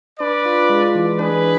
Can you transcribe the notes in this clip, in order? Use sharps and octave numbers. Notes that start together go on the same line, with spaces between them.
D4 B4 D5
F4
G#3
E3
D4 G#4 B4